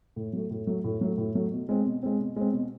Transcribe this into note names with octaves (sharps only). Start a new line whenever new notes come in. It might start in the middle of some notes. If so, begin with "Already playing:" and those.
A2
F#3 A3
A2
F#3 A3
A2
F#3 A3
A2
F#3 A3
B2
G#3 C4
B2
G#3 C4
B2
G#3 C4
B2